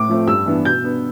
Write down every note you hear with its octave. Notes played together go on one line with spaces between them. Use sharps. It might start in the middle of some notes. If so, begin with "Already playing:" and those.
Already playing: A2 D6
F3 A3 C4
G2 E6
E3 B3 D4
B2 G6
B3 D4